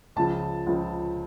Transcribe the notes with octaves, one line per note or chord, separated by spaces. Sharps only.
C#2 C#3 F3 A5
C#2 C#3 F3